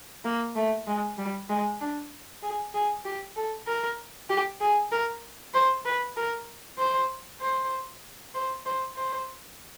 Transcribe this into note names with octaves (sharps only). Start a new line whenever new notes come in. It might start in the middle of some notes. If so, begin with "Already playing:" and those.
A#3
A3
G#3
G3
G#3
D4
G#4
G#4
G4
A4
A#4
G4
G#4
A#4
C5
B4
A#4
C5
C5
C5
C5
C5